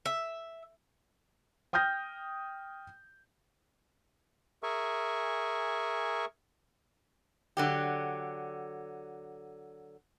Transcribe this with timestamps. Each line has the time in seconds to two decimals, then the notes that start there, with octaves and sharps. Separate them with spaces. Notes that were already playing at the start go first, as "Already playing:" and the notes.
0.06 E5
1.73 G5 D#6 F6 G6 A#6
4.63 G#4 A#4 E5 G#5 C#6
7.57 D3 F#3 G4